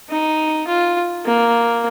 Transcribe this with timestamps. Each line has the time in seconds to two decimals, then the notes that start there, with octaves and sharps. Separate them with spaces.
0.10 D#4
0.68 F4
1.26 A#3